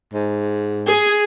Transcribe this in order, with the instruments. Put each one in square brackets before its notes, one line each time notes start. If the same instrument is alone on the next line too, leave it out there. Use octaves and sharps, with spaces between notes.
[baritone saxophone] G#2
[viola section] G#4